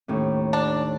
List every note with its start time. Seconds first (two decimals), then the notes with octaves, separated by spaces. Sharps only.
0.08 D#2 A2 C#4
0.53 D4